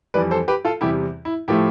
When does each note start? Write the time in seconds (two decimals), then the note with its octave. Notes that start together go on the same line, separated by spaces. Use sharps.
0.14 F2 E3 G3 B4 D5
0.31 A4 C5
0.48 G4 B4
0.65 F4 A4
0.81 E2 C3 G3 E4 G4
1.25 E4
1.48 A2 F3 A3 E4 G4